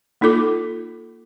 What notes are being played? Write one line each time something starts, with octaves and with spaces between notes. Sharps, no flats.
A#3 D#4 F4 A4 D6